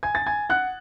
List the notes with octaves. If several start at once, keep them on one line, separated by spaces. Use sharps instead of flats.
G#5 G#6
A6
G#5 G#6
F#5 F#6